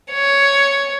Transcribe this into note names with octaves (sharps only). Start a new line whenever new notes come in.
C#5